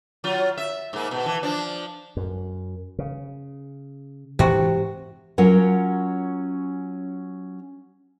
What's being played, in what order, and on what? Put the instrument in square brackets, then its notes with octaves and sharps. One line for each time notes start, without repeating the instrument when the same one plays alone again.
[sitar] F#3 F4
E5
G#2 A#3
B2
E3
F3 D4
[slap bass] F#2
C#3
[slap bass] G#2 C4 [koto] C3 F#4 [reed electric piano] E3
[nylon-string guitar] F#3 C#4 F4 A#4 F#5